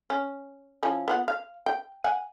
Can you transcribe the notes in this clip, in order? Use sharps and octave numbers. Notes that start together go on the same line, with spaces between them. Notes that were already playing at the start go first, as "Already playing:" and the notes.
C#4
F3 C#4 E4
B3 F4 F#5
F5
G5
F#5 G#5